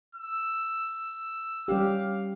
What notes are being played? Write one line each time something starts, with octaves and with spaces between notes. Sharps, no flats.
E6
G3 C#4 G4 F5